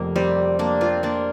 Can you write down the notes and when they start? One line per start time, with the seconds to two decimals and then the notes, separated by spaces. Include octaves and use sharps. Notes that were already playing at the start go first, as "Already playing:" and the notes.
Already playing: F1 F2 C3 A#3
0.16 G3 C4
0.59 A#3 D4
0.81 C4 F4
1.03 A#3 D4